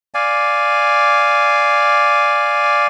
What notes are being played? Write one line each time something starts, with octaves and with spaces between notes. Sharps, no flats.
D5 F5 G#5